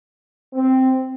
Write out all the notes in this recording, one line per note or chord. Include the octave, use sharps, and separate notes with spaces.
C4